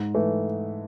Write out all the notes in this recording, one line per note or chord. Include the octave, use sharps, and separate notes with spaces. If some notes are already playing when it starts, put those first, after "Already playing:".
Already playing: G#2
E3 A3